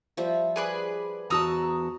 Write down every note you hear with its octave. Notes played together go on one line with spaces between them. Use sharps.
F3 G3 E5
G#4 B4 D5
E2 F#4 A5 A#5 D#6 E6